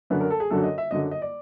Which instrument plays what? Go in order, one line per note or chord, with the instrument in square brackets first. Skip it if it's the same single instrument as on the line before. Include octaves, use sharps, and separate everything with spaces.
[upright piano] F#2 D3 F#3 B4
A#4
A4
G#4
F#2 D3 F#3 A4
D#5
E5
F#2 D3 F#3 D#5
D#5
D5